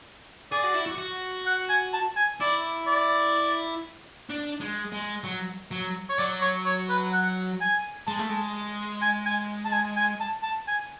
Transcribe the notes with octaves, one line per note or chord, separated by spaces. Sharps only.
G#4 D5
F#4
E4
F#4
F#4
F#5
G#5
A5
G#5
E4 D5
D5
D4
G#3
G#3
F#3
F#3
C#5
F#3 D5
C#5
C#5
B4
F#5
G#5
G#3 A5
A3
G#3
G#5
G#5
A5
G#5
G#5
A5
A5
G#5